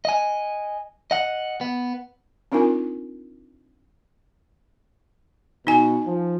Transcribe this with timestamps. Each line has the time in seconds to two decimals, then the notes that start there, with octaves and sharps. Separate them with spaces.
0.05 D#5 G#5
1.11 D#5 F#5
1.61 B3
2.52 C4 D4 D#4 F4 A#4 G#5
5.67 B2 D#4 G#5
6.06 F3